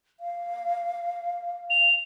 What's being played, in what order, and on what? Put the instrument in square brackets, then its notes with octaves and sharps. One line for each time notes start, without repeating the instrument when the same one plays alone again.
[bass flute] F5
[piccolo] F7